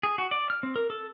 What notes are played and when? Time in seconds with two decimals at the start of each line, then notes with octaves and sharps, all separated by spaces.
0.03 G#4
0.18 F#4
0.31 D5
0.50 F6
0.63 C4
0.76 A#4
0.90 A4